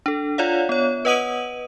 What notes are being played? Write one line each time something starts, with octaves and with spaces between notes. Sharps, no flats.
D4 A4
F4 C#5 D5 F5 F#5
B3 C#5
B4 D#5 F#5 D#6 D#7 F#7